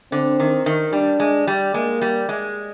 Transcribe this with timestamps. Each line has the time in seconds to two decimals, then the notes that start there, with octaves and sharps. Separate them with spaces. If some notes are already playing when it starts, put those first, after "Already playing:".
0.12 D3 C4
0.40 D#3
0.66 D#3
0.93 G3 D4
1.20 G#3
1.47 G3
1.74 G#3 A#3
2.02 G3
2.29 G#3